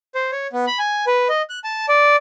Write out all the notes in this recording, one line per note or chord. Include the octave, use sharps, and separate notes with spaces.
C5
C#5
B3
B5
G#5
B4
D#5
F#6
A5
D5